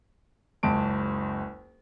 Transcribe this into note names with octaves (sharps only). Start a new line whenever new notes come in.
F#1 C#2 A5 D7